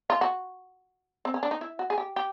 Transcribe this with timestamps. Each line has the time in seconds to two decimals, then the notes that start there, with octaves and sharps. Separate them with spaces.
0.10 F4
0.21 F#4
1.25 C4
1.34 C#4
1.43 D4
1.51 D#4
1.61 E4
1.79 F#4
1.90 G#4
1.98 G4
2.16 G4